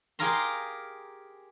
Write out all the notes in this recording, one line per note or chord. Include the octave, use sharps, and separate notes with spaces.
G4 G#4 A#4 F5 A#5 C6